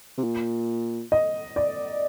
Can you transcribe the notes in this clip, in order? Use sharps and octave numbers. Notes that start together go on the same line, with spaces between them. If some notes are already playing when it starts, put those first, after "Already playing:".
C3
A#2
D#5
D5